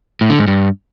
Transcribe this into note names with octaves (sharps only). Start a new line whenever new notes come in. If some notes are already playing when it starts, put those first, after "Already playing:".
A2
D3
G#2
G2